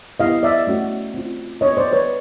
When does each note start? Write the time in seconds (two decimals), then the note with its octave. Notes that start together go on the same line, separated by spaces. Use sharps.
0.20 B3 E4 G4 D#5 F5
0.43 D5 E5
0.67 A3 C#4 F#4
1.14 C4 F4
1.61 B3 D4 F#4 C#5 D#5
1.77 C5 D5
1.93 B4 C#5